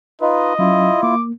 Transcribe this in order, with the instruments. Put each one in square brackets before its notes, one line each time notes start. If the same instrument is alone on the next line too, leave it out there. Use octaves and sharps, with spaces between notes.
[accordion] D#4 F4 B4 [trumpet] D#5
[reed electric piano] F#3 C#4 [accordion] E4 F4
[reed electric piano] A#3 [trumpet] D6